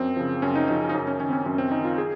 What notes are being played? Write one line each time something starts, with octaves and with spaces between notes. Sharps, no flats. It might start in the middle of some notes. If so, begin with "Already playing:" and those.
Already playing: F#2 C4
C#3 F3
F#2 C#4
D#4
C#3 F3 D#4
D#4
F#2 C#4
C#4
D#3 C#4
C4
C#4
F#2 C#4
C4
D#3 D#4
F4
G#4